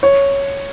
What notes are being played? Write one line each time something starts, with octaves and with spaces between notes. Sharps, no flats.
C#5